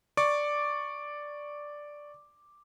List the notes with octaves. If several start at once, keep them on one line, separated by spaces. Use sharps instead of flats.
D5 C#6 D6